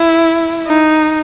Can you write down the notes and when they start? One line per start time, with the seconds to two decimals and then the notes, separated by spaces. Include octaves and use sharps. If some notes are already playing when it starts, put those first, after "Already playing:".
Already playing: E4
0.67 D#4